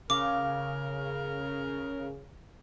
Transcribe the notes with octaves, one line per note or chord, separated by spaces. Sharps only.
C#3 A#4 F5 D6